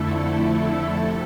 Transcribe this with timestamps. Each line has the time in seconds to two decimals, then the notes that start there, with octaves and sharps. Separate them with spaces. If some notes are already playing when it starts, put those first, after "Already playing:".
Already playing: F2 D3 A3 E4 A4
0.29 A4
0.95 C3